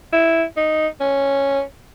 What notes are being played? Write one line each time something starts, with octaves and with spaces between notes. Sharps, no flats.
E4
D#4
C#4